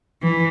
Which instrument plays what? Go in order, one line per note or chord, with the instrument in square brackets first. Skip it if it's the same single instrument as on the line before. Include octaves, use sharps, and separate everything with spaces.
[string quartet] E3